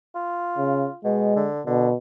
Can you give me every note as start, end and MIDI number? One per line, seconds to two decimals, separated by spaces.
0.15 1.00 65
0.58 0.88 49
1.05 1.34 47
1.05 1.48 56
1.36 1.61 50
1.67 1.96 47
1.67 1.88 50